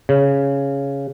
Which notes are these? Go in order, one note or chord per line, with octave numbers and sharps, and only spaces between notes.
C#3